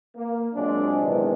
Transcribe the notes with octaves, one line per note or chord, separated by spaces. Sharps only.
A#3
A#2 F#3 G#3 C4 D4
E2 C3 D#3 E3 G#3